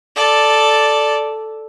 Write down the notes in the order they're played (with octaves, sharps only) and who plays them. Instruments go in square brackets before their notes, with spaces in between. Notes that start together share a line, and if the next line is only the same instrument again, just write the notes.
[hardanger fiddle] A4 D5